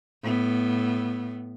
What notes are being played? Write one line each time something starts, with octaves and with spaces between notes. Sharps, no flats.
A2 B3